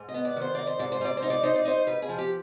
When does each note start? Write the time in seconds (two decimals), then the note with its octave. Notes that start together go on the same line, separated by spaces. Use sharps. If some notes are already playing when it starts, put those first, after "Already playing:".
Already playing: G#2
0.08 D#5
0.14 B3
0.25 D5
0.36 D#3 C5
0.55 D#4 D5
0.67 C5
0.79 G#2 D5
0.92 C5
1.01 G#2 D5
1.17 C5
1.22 D#4
1.30 D5
1.43 D#4 C5
1.56 D5
1.65 D#4 C5
1.87 G#2 B4
2.02 G#4
2.09 F3
2.18 G4